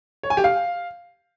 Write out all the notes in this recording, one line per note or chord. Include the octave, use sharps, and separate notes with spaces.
C#5
G#5
G4
F5